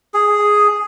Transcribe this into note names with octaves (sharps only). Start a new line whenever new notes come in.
G#4